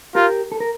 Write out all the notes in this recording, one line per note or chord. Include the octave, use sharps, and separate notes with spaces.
F4 G4 A#4
A4
A#4